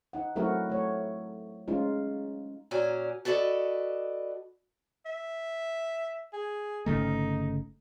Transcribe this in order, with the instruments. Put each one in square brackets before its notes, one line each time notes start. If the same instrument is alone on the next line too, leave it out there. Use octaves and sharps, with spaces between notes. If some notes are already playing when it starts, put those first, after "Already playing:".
[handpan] D#4 F#5
F#3 A3 C4 E4 F#4 A#4
A3 C#5
G#3 C#4 D#4 F4
[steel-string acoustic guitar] A#2 C#4 F#4 D5 G#5 A#5
F#4 A4 B4 D5 D#5
[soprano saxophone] E5
G#4
[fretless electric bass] G1 C#3 A3 [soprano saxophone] D#4